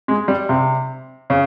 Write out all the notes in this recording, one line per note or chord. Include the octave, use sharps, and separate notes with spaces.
G#3
G3
C3
C#3